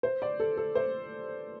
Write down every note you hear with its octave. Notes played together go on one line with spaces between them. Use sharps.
C5
D5
A4
A4
C5